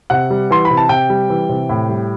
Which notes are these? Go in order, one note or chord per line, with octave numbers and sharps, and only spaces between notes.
C3 F#5
G3
E3 C6
B5
C3
A5
C3 G5
G3
E3
C3
A2
G3